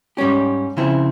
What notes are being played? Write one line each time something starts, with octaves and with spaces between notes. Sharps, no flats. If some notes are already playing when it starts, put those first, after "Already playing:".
G#2 G3 C#4 G4
C#3 F3 C4 E4